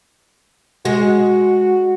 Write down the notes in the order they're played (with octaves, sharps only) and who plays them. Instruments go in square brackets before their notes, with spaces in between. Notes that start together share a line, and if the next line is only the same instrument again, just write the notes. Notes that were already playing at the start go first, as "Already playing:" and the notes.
[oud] G#3 [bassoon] F#4